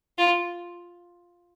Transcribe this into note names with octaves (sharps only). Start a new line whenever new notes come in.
F4